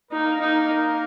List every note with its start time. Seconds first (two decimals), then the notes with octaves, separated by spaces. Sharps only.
0.12 A#3 D#4 A#4
0.40 D#4